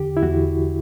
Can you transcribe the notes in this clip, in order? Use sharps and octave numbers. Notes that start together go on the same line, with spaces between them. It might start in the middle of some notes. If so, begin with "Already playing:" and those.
Already playing: E2 D3 G4
E4
E2 F#4